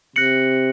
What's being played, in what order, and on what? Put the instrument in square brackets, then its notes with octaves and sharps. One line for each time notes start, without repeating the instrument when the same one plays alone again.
[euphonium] C3 [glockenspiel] F#6 A#6 C#7 F#7